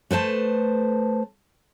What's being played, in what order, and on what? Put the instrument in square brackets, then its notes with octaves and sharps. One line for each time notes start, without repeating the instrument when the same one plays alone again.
[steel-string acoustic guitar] A3 B4 C5 A5